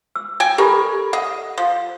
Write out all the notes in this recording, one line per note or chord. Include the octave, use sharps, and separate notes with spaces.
E6
G5 G#5
G4 A4 A#4 B5
D#5 F#5
F3